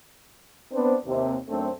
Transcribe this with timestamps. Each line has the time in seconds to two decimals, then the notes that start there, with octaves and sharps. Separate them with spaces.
0.71 B3 C4 D4 B4 C5
1.06 D#2 C3
1.48 F#2 A3 C4 D4 A4 C5